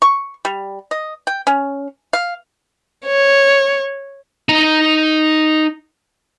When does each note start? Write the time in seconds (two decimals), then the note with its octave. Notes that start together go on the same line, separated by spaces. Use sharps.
0.02 C#6
0.45 G3
0.91 D#5
1.27 G5
1.47 C#4
2.13 F5
3.06 C#5
4.49 D#4 A#5